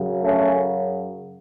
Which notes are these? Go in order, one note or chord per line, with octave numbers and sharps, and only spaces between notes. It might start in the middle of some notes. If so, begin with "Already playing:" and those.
Already playing: F#2 C#3 F#3
A3 C#4